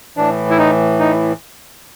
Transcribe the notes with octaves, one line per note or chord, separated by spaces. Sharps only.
A2 E3 D4
E4
D#4
D#4